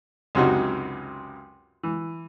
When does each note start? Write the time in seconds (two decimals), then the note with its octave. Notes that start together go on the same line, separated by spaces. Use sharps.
0.35 C#2 F#2 C3 D#4 F#4
1.83 E3